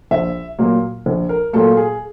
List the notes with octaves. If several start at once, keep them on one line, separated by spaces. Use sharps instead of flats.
A#1 E5
A#2 F#3 A#3
A#1
A#4
A#2 F#3 A#3 A4
G#4